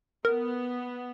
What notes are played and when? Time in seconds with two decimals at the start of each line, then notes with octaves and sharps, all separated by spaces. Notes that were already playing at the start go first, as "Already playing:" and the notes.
0.25 B3 A#4